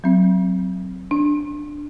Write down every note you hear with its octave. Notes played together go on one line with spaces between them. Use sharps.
F#3 C4
D4